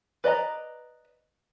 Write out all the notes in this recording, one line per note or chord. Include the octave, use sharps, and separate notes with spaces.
B4 D5 D#5 A#5